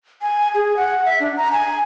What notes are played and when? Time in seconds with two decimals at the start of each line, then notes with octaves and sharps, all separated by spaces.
0.22 G#5
0.55 G#4
0.77 F#5
1.05 E5
1.20 D4
1.37 A#5
1.53 G#5